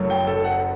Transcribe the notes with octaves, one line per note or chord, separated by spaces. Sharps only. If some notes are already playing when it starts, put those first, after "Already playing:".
Already playing: F#1 F#2 F#3 A3
G5
A4
F#5